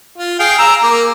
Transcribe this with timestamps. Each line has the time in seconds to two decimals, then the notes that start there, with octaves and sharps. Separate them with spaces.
0.18 F4
0.40 G#4 F5 G5
0.59 A#5 E6
0.83 A#3 D6